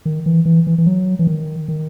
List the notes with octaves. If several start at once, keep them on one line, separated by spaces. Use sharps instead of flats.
D#3
E3
E3
E3
E3
F#3
E3
D#3
D#3